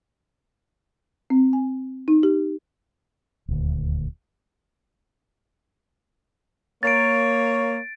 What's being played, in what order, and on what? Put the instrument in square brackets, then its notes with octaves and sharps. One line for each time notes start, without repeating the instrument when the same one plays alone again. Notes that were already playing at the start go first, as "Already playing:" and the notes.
[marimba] C4
G#5
D#4
G4
[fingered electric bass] D#1 D2
[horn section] A#3 C#5 [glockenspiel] A6 D7